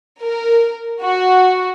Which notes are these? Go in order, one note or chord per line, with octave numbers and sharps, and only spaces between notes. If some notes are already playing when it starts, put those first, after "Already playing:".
A#4
F#4